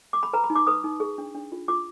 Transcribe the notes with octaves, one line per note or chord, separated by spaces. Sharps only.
D6
B5
B4 A#5
B5
D#4
D6
B4 D#6
D#4
G#4
D4
D4
F4
F4 D6